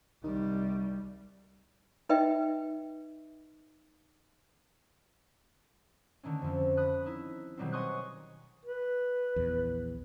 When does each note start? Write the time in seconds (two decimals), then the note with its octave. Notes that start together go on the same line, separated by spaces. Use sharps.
0.24 C2 D#3 G3
2.09 D#4 B4 D#5 E5 G5
6.23 D3 D#3 A3 C#4
6.42 F2 F3
6.77 B5 D#6 F#6
7.05 D#4 E4
7.57 B2 D#3 F#3 G3 A#3 C4
7.72 D#5 G#5 C6 C#6 D#6 F#6
8.66 B4
9.36 A#1 E2